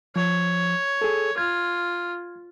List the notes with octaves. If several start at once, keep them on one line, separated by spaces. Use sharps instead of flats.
F3 C#5
G#4 A4
F4 G#6